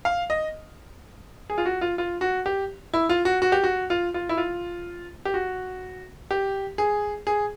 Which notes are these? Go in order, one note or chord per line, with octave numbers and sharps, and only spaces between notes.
F5
D#5
G#4
F4
F#4
F4
F4
F#4
G4
E4
F4
F#4
F#4
G4
F#4
F4
F4
E4
F4
G4
F#4
G4
G#4
G#4